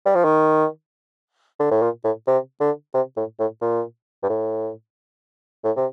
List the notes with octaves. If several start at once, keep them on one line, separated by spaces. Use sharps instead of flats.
G3
F3
D#3
D3
A2
A#2
A2
C3
D3
C3
A2
A2
A#2
G2
A2
A2
C3